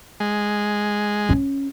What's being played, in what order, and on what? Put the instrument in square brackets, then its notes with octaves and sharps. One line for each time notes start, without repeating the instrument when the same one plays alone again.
[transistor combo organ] G#3
[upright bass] C#4